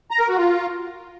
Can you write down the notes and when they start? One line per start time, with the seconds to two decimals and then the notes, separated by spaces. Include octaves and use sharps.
0.11 A#5
0.20 A#4
0.28 F#4
0.37 F4